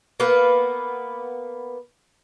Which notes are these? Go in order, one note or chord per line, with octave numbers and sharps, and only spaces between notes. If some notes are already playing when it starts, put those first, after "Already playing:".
A#3 B3 B4